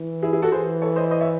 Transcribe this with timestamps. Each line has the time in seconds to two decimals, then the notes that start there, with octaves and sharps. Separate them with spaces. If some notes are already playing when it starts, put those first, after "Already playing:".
Already playing: E3
0.22 E4 G#4
0.33 E4 G#4
0.42 F#4 A4
0.52 E3 G#4 C5
0.82 A4 C#5
0.96 C5 D#5
1.11 C5 D#5
1.21 C#5 E5